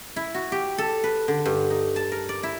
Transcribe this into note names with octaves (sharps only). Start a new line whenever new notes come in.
E4
F#4
G4
A4
B4
D3
G2
D#4
A5
A#4
D5
E4